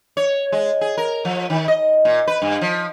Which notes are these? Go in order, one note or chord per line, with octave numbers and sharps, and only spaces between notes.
C#5
G#3
G#4
A#4
F3
D#3
D#5
A#2
B4
G2
F3